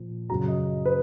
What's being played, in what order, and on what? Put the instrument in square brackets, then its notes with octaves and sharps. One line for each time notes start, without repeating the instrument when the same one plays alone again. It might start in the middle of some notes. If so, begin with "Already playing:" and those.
Already playing: [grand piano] A#2 F3
F#2 C#3 F#3 A#5
D#5
B4